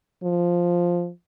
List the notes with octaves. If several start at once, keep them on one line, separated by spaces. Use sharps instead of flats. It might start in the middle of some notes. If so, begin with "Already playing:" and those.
F3